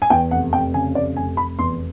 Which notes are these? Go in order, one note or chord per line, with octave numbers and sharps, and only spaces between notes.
G#5
E2 G5
F1 F#5
F1 G5
C#3 G#5
F1 D5
F1 G#5
F1 B5
E2 C6